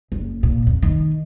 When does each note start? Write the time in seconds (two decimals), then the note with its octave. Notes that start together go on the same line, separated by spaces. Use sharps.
0.12 F#1
0.43 A#2
0.67 F2
0.83 D#3